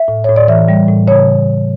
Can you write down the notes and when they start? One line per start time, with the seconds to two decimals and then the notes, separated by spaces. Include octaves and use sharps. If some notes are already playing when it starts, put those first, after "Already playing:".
Already playing: E5
0.08 A2
0.24 A2 C#5
0.36 D5
0.48 E3 E5
0.69 G3
0.88 A2
1.08 C#3 C#5